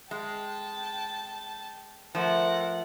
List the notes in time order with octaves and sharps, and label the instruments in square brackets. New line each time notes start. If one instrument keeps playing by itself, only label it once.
[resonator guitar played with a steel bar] G#3 [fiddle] G5 A5
[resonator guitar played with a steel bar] F3 A3 [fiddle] A#4 F#5